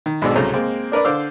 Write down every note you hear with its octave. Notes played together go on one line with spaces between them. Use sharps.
D#3
B1 G#2 B2 G#3 D4 E6
C2 C#3 F#3 A3 C5 A#5
G#3 A#3 C4
D4 A#4 B4 D5
D3 C5 D5 F5 D6 E6